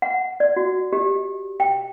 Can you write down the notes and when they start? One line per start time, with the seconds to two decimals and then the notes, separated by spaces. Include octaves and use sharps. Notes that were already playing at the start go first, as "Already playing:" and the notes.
0.02 F#5
0.40 D5
0.57 F#4
0.93 G4
1.60 G5